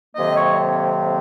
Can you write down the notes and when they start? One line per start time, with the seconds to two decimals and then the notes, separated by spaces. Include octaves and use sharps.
0.15 F2 C3 D#3 F#3 A#3 D#5
0.35 C#5